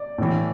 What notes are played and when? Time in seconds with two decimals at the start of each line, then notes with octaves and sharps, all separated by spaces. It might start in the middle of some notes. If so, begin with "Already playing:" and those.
Already playing: D5
0.18 A2 E3